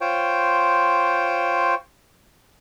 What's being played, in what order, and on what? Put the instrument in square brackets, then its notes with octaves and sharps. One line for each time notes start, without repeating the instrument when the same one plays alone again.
[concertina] F4 C5 C#5 G5